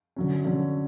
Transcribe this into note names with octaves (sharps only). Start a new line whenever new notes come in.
D3 F#3 C#4
D3 F#3 C#4